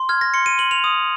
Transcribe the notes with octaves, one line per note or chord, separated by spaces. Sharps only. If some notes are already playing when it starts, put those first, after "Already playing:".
Already playing: C6
F6 G#6
A#6
C6 C#7
D#7
C6 F#7
F7
D#6